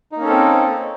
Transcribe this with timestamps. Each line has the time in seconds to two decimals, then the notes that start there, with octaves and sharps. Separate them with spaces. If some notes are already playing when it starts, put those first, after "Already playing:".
0.12 D#4
0.16 A#3
0.21 C#4
0.25 A4
0.30 C4